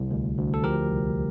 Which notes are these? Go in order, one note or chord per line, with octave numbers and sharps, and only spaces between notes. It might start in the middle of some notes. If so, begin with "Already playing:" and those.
Already playing: C2
D2
D2
A4
F3 G4 A#4
C2